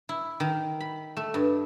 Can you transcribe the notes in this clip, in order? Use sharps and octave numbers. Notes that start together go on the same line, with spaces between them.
E4
D#3
B5
A3
G2